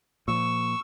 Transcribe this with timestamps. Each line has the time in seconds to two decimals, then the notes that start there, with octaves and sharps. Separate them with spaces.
0.28 A#2 F3 C#6 E6